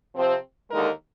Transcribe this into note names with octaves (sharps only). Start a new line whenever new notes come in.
C3 F3 C4
D#2 D3 G#3 D#4 A#4